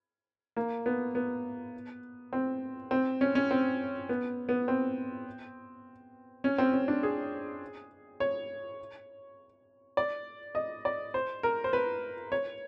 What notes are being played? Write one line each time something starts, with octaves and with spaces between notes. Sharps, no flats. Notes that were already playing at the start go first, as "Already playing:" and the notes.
A#3
B3
B3
C4
C4
C#4
C#4
C4
B3
B3
C4
C#4
C4
C#4
D4
G#4
C#5
D5
D#5
D5
C5
A#4
C5
B4
C#5